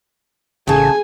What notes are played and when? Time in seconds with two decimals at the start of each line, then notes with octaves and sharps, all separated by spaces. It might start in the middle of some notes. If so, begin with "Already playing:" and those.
0.67 A1 C#3 G#4 G#5 A5